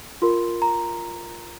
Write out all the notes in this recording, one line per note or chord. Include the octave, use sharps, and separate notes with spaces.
F4 A#4 C6
A#5